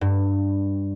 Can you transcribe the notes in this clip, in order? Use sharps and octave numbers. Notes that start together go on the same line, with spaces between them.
G2